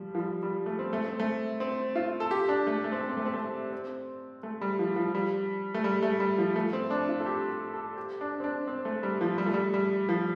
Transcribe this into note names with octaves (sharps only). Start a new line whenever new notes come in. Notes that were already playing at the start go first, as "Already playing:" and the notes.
Already playing: F3 G3
F3
G3
G3
A3
C4
A3
C4
A3
C4
F4
A4
G4
D4
A3
A3
C4
A3
C4
A3
C4
A3
C4
A3
G3
F3
F3
G3
A3
G3
A3
G3
F3
A3
C4
D4
F4
A4
G4
G4
A4
G4
D4
C4
D4
C4
A3
G3
F3
G3
A3
G3
G3
F3